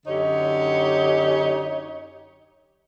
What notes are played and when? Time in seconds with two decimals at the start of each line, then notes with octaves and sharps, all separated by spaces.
0.06 F#2 D3 D#4 G4 C#5